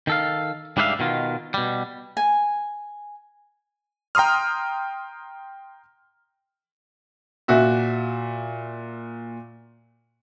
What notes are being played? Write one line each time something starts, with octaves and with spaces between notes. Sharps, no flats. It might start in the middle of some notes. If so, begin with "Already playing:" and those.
D#3 A4 F5
G#2 G3 D4 C5 E5 F5
B2 D#3 F4
B2 G3
G#5
G5 A#5 C6 D#6 F6
A#2 F#4 E5